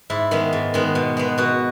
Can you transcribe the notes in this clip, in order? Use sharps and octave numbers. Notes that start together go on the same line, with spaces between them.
G#2 E4
D#3 G#3 B3
G#2
D#3 G#3 B3
B2
G#3 B3
B2 F#4